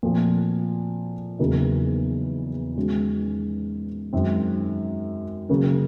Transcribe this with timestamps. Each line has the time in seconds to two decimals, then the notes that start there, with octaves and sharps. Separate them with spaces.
0.03 A#2 F3 A3 C4 F4
1.39 E2 C#3 F#3 A#3 D#4
2.76 D#3 G#3 C#4 F#4
4.13 F#2 D#3 G#3 C4
5.49 C#3 F#3 A#3 C#4